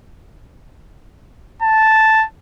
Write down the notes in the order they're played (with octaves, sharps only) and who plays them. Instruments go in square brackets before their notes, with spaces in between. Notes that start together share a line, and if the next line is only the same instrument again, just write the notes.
[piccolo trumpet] A5